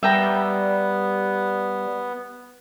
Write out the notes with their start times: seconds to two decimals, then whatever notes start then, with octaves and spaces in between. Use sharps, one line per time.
0.03 G3 B3 E5 G5 A#5